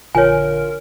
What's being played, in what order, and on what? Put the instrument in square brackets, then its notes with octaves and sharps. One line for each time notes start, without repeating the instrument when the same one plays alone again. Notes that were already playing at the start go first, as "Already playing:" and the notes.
[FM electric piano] A#1 D3 [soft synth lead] F4 [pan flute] A#4 [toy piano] C#5 G#5